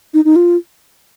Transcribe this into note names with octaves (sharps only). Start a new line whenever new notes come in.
D#4
D#4
F4